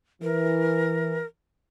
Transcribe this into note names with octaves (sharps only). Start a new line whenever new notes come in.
E3 A#4